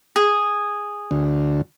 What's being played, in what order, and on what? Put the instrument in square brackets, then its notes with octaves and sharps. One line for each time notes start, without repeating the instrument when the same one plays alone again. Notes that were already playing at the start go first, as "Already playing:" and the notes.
[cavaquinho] G#4
[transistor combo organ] D2